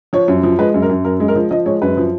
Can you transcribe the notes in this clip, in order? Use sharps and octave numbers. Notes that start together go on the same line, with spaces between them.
F3 C#5
F#2
F3
G#3 B4
F#2
A#4
F#2
F#2 A#4
G#3
A#4
F3
F3 D#5
G#3 C#5
F#2 B4
F3